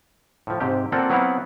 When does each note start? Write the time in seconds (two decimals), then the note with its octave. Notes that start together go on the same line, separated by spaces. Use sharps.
0.47 A2 F3
0.60 G#2 C3 G4
0.92 A#3 C4 F4 A4 D5 F#5
1.10 F#3 B3 C4 E4 F5 F#5